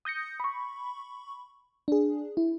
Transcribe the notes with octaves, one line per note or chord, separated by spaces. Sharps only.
D#6 G6 A#6 C#7
B5 C#6
D4 G#4
E4